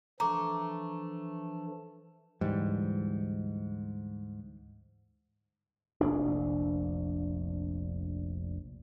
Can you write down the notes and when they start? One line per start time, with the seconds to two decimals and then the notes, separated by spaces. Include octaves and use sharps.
0.20 E3 F3 A3 D4 A#5 D6
2.41 D2 G#2 E3 G3
6.01 F1 A#1 D4